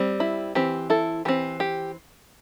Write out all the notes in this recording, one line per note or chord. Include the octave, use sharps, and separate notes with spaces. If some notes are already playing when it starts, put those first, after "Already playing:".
Already playing: G3 C4
E4
E3 C4 G4
E4 A4
E3 C4 G4
G4